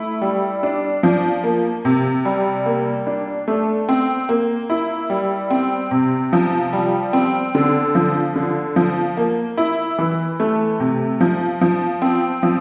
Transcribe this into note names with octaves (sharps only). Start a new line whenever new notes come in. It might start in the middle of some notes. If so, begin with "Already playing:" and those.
Already playing: A3 E4
G3
D4
F3
A#3
C3
G3
A#3
D4
A3
C4
A#3
E4
G3
C4
C3
F3
G3
C4
D3
F3
D3
F3
A#3
E4
E3
A3
C3
F3
F3
C4
F3